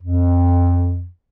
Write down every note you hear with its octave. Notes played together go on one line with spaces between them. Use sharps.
F2